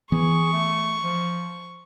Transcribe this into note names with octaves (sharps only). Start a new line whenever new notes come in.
E3 B3 G#4 C#6
A3
F3